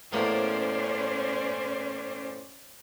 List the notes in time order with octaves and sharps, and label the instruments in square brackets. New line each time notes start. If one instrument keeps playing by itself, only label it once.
[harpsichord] E2 A2 A#3 [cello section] C#4 C5 D5